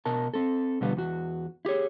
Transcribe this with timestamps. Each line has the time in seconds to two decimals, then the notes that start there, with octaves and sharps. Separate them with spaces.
0.05 B2 A#4 A5
0.34 C4 A4
0.81 B2 D3 F3 G3 B3
0.97 E2 F#4
1.65 E4 G4 G#4 C#5